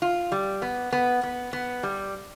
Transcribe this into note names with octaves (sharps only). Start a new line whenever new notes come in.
F4
G3
B3
B3
B3
B3
G3